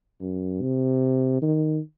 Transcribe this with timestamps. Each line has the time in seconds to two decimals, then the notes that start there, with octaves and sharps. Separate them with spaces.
0.21 F#2
0.62 C3
1.42 D#3